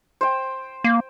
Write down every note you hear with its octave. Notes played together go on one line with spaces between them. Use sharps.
C5 G5
A#3